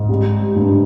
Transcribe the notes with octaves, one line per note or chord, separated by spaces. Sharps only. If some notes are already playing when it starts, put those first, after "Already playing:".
Already playing: G#2
G3
G2